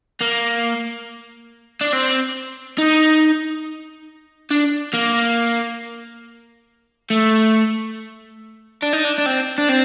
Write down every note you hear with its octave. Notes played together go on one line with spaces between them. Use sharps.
A#3
D4
C4
D#4
D4
A#3
A3
D4
D#4
D4
D4
C4
D4
C4